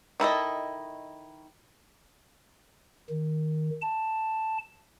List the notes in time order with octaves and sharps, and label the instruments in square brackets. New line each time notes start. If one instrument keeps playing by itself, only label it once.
[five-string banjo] D#3 E4 A4 D#5
[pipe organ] D#3
A5